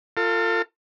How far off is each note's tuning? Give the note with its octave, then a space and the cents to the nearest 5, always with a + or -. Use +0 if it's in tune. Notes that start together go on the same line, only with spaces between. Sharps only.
F4 +0 A4 +35